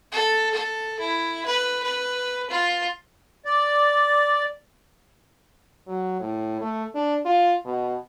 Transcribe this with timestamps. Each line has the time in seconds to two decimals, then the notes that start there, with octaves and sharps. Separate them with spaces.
0.12 A4
0.54 A4
1.00 E4
1.46 B4
1.84 B4
2.50 F4
3.45 D5
5.87 F#3
6.21 A2
6.61 A3
6.95 D4
7.25 F4
7.65 B2